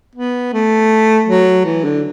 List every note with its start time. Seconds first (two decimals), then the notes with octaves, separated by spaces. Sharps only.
0.15 B3
0.53 A3
1.28 F#3
1.66 E3
1.84 D3